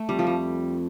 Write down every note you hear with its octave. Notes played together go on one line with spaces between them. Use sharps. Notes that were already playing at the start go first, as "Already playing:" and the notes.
Already playing: A3
F2 G3
F3
G3